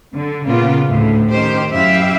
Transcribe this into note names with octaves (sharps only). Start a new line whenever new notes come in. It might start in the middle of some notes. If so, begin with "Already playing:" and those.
D3
A#2 C#3 A#3 B3 F4
D2 A2
D#3 C#4 G4 C5
F#2 E4 G4 E5 F5